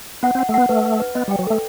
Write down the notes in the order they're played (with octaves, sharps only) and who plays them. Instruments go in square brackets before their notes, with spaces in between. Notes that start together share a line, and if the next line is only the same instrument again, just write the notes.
[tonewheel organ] B3 [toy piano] F#5
[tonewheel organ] C4
[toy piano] F#5
[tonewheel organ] A3
[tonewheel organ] B3 [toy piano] F#5
[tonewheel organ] A3 [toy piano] B4
[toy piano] B4
B4
[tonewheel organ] B3 [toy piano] D#5
[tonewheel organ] G3
[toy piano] G5
[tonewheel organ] F#3
[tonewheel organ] A3 [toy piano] A4